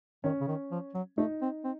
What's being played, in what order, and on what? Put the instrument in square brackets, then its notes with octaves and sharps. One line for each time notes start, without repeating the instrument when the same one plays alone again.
[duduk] D#3 [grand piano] C#4
[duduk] C#3
D#3
F3
F#3
[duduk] A3 [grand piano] D#4
[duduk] C4
C4